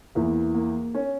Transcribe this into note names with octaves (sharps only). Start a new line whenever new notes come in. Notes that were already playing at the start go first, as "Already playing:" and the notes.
E2 E3 A#3
A#3
C#4